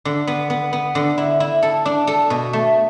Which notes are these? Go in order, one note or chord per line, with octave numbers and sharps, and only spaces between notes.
D3
B3
B3
B3
D3
E4
E4
A4
D4
A4
B2
A3